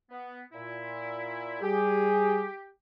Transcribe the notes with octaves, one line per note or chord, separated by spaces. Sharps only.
B3
A#2 E4
G3 G4 G#4